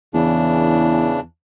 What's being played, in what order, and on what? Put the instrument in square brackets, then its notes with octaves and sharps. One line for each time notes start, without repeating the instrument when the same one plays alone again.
[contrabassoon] E2 [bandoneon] C#3 E3 D4